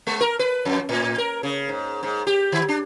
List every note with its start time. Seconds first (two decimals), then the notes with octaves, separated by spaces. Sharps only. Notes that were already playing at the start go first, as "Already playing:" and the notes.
0.07 G#3
0.21 A#4
0.39 B4
0.65 F2
0.89 A2
1.18 A#4
1.43 C#3
1.69 G#2
2.03 G#2
2.27 G4
2.52 D#3
2.68 D4